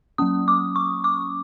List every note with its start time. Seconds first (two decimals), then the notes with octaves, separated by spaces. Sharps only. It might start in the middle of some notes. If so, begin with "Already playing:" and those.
0.18 F#3 A#3 C#4 D#6
0.48 D6
0.76 C#6
1.04 D6